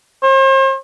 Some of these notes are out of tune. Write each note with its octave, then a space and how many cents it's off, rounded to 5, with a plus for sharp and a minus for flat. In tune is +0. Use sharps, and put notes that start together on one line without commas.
C5 +40